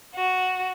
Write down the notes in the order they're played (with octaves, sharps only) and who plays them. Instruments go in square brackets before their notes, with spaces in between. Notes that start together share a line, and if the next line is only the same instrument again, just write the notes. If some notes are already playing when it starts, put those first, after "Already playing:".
[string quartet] F#4